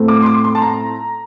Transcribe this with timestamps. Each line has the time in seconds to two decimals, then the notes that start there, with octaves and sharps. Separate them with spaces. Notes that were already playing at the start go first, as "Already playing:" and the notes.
Already playing: A2 A3 C4
0.08 D6
0.22 C6
0.26 D6
0.44 C6
0.55 A5
0.62 A#5